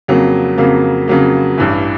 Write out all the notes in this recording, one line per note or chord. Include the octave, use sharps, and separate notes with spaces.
F2 C#3 F#3 A#3
F2 C#3 F#3 A#3
F2 C#3 F#3 A#3
A1 G2 E3